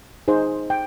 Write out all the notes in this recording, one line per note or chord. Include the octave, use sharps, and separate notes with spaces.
D#4 G#4 C5
G5